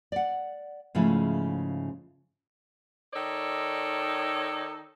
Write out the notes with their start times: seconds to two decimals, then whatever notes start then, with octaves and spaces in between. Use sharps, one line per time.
0.12 D5 F#5
0.95 G#2 C#3 F3 A3 E4
3.13 D#3 D#4 A4 C#5 D5